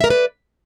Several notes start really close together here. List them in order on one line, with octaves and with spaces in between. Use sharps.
E5 A#4 D5 B4